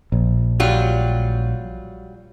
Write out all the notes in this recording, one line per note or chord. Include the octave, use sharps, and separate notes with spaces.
A#1
F#3 G3 F4